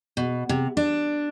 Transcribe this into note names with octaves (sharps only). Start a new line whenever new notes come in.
B2
C3
D4